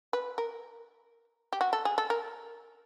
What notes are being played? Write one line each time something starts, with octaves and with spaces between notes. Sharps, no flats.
B4
A#4
G4
F#4
A4
G#4
A4
A#4